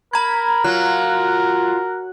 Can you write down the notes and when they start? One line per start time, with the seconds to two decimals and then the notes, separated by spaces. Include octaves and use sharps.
0.13 A#4 A#5 B5 G#6
0.64 F#3 F4 F#6